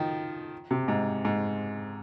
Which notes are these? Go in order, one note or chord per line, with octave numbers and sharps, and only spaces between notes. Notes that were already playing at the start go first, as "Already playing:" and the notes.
Already playing: D#3 F3
C3
G#2
G#2